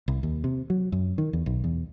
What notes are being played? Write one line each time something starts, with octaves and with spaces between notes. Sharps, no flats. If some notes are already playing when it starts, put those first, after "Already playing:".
C2
D#2
C3
F#3
F#2
D#3
E2
B1
E2